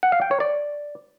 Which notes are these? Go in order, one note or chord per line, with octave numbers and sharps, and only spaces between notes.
F#5
F5
G5
C#5
D5